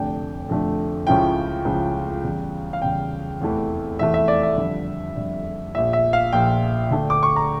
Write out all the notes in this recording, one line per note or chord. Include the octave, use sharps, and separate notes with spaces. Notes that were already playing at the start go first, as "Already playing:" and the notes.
Already playing: F1 F2 D3 A3 D4 G5
F1 F2 D3 A3 D4
C#2 C#3 F3 C#4 E4 G5
C#2 C#3 F3 C#4 E4
E2 C#3 G3
F5
E2 C#3 G3 G5
F1 E2 E3 A3
F1 E2 E3 A3 E5
E5
D5
E5
F2 D3 G3
F2 D3 G3
A#1 A#2 F3 E5
E5
F5
A#1 A#2 F3 G5
D2 D3 A3 D4
D6
C#6
A#5